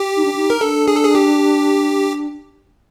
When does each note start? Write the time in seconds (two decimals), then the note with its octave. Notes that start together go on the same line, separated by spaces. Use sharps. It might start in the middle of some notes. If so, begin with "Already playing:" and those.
Already playing: G4
0.17 D#4
0.25 D4
0.35 D#4
0.50 A#4
0.61 D4 A4
0.88 G#4
0.96 A4
1.05 G#4
1.15 G4